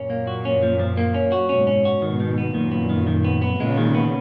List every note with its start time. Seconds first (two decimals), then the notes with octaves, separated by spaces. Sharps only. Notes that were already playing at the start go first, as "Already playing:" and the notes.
Already playing: F#2 A#2 C#4
0.10 A#3
0.27 F#4
0.45 C#4
0.63 F3
0.79 F3
0.97 A#3
1.14 C#4
1.32 F#4
1.49 G#2 B2 C#4
1.67 C#4
1.85 F#4
2.02 G#2 B2 D#3
2.20 D#3
2.38 B3
2.54 F#2 A#2 D#3
2.72 B3
2.90 D#3
3.07 D#3
3.25 B3
3.42 B3
3.60 A#2 C#3 G#3
3.77 D#3
3.95 B3